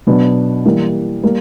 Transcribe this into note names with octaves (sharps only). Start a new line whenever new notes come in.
B2 F#3 B3 D4
E3 G3 A#3
G3 A#3